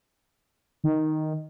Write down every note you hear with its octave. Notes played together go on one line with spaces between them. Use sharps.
D#3